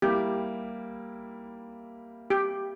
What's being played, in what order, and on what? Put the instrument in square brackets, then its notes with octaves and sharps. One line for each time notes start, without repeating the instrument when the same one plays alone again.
[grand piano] G3 A#3 E4 [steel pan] G4
[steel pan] G4